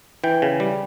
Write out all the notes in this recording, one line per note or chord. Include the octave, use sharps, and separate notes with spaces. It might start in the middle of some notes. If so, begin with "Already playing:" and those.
E3 G5
C#3
G3